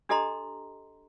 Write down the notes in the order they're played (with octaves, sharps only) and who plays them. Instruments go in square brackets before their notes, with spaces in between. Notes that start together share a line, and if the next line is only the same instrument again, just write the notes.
[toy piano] D4 G4 A4 D#5 A#5 C6